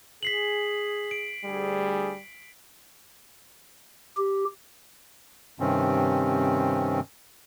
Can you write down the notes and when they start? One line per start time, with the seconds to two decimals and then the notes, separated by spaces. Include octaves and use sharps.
0.23 G#4 B6 C7 F#7
1.11 D7
1.45 D2 G3 G#4
4.17 G4
5.60 G2 C3 D#3 C4 C#4